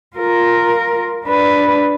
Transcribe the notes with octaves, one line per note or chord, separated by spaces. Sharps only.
F4 A#4
D4 B4